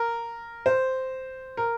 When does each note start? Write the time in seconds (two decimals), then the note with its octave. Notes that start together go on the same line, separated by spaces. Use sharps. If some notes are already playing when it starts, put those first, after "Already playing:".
Already playing: A#4
0.66 C5
1.57 A#4